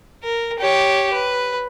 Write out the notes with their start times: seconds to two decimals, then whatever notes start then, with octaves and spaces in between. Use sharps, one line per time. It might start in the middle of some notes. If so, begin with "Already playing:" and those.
0.23 A#4
0.59 G4 C#5
1.13 B4